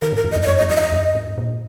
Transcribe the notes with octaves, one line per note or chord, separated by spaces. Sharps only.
D#3 A#4
G#2 A#4
E2
D#5
F#2
D#5
F#2 C#5
D#5
F#2
E2 D#5
E5
D#5
F#2
G#2
A#2